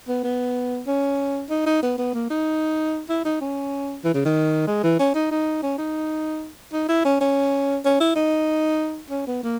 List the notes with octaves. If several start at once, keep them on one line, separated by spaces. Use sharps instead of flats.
B3
B3
C#4
D#4
D#4
B3
B3
A#3
D#4
E4
D#4
C#4
E3
C#3
D#3
G#3
E3
C#4
D#4
D#4
C#4
D#4
D#4
E4
C#4
C#4
C#4
E4
D#4
C#4
B3
A#3